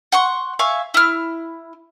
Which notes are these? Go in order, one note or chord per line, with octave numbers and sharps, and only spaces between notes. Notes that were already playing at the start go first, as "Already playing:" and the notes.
F#5 C6 C#6
E5 F5 G#5 C#6
E4 F6